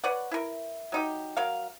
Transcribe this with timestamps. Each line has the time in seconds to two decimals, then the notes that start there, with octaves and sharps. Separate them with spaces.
0.04 B4 C#5 D5 F#5
0.31 E4 A#4
0.92 F#3 D#4 G4
1.37 F#3 A#4 F5